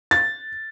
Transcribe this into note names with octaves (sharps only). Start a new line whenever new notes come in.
A6